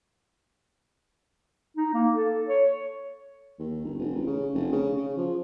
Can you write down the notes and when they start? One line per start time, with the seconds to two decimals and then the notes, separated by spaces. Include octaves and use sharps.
1.77 D#4
1.94 A#3
2.14 A4
2.47 C#5
3.59 D#2
3.84 G1
3.99 F1
4.15 A1
4.26 C#3
4.54 F1
4.72 C#3
4.96 C#3
5.17 F3